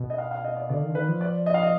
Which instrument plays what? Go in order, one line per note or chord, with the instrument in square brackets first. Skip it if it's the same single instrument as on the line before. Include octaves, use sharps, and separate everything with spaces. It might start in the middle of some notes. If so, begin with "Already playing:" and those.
Already playing: [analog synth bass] B2
[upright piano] D#5
F5
F5
D#5
D5
[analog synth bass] D3 [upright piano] D5
[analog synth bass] D#3
D3
[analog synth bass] D#3 [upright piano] B4
[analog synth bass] F3
[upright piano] D5
D#5
F5
D#5